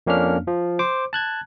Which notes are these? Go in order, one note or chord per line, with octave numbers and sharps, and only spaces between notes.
F2 A#3 C#4 D4 F6
F3
C5 D6
A5 F#6 G#6